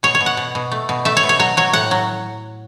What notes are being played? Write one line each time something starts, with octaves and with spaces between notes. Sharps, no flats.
B2 C#5
C#5
B2
F#5
B2
B2
A3
B2
A3 E5
C#5
B2
C#5
F#3 C#5
F#3 C#5
A2 F#5
F#3